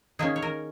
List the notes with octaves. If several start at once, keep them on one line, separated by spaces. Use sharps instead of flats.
D#3 A#3 C#4 G#4
C#5
A#4